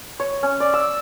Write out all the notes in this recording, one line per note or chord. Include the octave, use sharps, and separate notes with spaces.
C#5
C#4
D5
E6